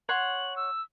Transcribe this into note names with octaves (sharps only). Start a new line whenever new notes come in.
C#5 F#5 C6 F#7
E6